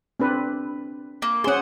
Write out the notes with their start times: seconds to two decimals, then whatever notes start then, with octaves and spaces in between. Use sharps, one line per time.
0.20 C4 D4 B4
1.22 A#3
1.44 C#4 G#4 C5 F#5